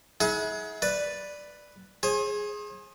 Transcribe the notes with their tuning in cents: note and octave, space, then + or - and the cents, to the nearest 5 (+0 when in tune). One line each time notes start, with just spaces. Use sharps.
E4 -40 G#4 +25 F#5 -15
B4 +0 D5 +0
G#4 +0 C5 +40